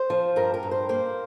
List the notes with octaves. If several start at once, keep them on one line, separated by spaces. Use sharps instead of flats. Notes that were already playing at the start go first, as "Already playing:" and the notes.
Already playing: C5
F3
G2 A#4
A#4
G2
C5
A#3 C5